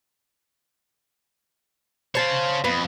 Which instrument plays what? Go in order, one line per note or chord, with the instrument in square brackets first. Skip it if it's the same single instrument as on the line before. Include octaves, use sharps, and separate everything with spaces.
[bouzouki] C5 A5 [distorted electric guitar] C#5 F5
[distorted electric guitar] F2 [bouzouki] B3